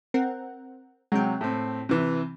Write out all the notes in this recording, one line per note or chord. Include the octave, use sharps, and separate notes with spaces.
C4 A#4 F#5
C3 F#3 G#3 G5
A2 C4
C3 E3